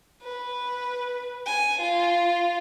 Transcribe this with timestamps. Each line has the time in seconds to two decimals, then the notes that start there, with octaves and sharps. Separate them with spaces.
0.22 B4
1.46 G#5
1.81 F4